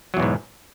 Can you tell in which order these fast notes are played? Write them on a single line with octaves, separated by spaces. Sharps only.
F#3 E2 B2 G#2